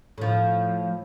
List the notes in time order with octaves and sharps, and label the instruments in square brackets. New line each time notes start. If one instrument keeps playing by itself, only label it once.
[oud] A2 F3